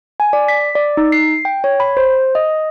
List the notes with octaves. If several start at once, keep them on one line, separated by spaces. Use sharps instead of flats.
G#5
D5
B6
D5
D#4
C7
G5
C#5
B5
C5
D#5